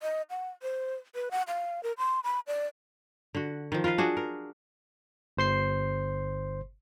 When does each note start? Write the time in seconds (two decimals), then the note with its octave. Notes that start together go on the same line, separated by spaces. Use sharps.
0.02 D#5
0.30 F#5
0.63 C5
1.15 B4
1.31 F#5
1.48 F5
1.83 A#4
1.98 C6
2.24 B5
2.47 D5
3.35 D3 F#4
3.72 D#3 F3
3.84 F4 A#4 B4 F5
3.98 D4 F#4 G#4
4.17 A#4
5.37 G1 C5 C6 C7